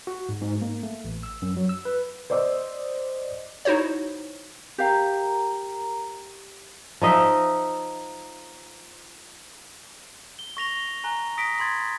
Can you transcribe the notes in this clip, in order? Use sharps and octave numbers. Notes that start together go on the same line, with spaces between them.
F#4
G#2
G#2
A#3
A3
A1
E6
F#2
F#3
E6
B4
C5 D5 D#5 D6 E6
D#4 E4 F#4 C5 C#5
G4 A#4 F5 A#5
F3 D#4 D#5 E5
G7
C#6 A#6 F7 G7
G#5 A#5 F#6 G7
D#6 A#6 B6 D7
B5 C6 G#6 A6